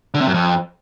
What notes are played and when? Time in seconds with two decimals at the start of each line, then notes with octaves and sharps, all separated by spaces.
0.14 D3
0.21 C3
0.27 F#2
0.34 F2